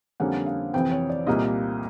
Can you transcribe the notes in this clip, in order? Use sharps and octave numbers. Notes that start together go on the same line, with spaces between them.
F2 D3 G3 A#3 C#4 F#5
F5
F2 C3 E3 G5
C#5
D5
C2 A#2 G3 A#3 D#5